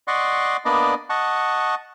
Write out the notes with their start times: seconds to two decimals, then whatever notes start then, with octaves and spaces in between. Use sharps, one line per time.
0.08 D5 D#5 F#5 C6 C#6
0.65 A#3 B3 D4 D5 D#5
1.10 D#5 F#5 A5 C#6